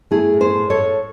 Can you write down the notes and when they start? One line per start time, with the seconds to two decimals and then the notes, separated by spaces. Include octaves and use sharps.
0.11 A3 E4 G#4
0.34 A2
0.40 G#4 C5
0.55 A2
0.70 A4 C#5
0.78 A2